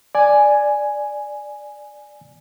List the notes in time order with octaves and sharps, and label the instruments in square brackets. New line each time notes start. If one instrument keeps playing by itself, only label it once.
[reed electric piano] D5 G#5